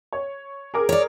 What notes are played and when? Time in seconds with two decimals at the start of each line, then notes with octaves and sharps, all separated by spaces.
0.13 C#5
0.74 G#4 A#4 D6
0.89 C#5 D5